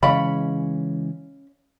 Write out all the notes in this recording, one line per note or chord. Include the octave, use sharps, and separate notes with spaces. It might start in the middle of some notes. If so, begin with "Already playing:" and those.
C#3 E3 G#3 C#4 D#5 F5 G#5 B5